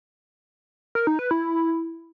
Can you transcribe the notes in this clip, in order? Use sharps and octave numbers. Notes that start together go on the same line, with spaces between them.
A#4
D#4
B4
E4